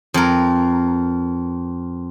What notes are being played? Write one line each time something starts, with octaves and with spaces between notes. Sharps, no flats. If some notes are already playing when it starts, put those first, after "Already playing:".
F2 A#4